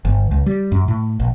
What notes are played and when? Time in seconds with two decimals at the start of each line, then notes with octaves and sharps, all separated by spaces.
0.05 G1
0.31 C#2
0.46 G3
0.72 F#2
0.88 A2
1.20 A#1